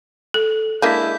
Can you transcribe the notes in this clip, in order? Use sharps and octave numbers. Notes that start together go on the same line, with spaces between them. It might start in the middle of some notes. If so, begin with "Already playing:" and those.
A4
G#3 A#3 D4 E4 G6 B6